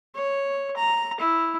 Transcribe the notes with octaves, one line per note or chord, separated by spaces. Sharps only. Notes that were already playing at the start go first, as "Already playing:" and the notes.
C#5
A#5
E4